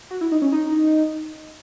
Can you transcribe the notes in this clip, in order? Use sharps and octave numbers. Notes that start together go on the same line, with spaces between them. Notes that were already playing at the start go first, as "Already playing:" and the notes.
F#4
E4
D#4
C#4
D#4